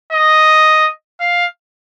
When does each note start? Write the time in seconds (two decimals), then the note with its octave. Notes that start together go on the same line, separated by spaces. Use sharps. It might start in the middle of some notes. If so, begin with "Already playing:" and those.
0.13 D#5
1.20 F5